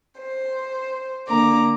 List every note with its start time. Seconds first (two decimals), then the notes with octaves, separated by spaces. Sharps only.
0.20 C5
1.27 D3 A#3 A#5 D6